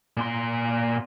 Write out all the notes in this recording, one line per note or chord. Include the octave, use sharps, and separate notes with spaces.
A#2 C6